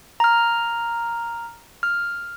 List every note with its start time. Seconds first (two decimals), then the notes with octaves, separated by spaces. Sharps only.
0.20 A#5 F6
1.83 F6